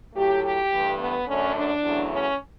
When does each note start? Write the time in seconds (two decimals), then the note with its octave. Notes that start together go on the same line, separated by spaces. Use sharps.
0.15 A2 F#3 A3 G4
0.43 G4
0.71 G2 E3 A3
1.00 B3
1.27 F#2 D3 A3 C#4
1.55 D4
1.83 E2 C#3 F#3 A3
2.12 C#4